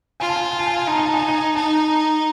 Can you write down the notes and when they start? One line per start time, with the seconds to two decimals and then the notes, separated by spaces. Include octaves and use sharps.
0.20 F4 G#5
0.29 A5
0.36 G#5
0.44 A5
0.51 G#5
0.59 A5
0.67 G#5
0.75 A5
0.82 G#5
0.88 D#4 A5
0.98 G#5
1.06 A5
1.13 G#5
1.21 A5
1.28 G#5
1.56 D#4 A5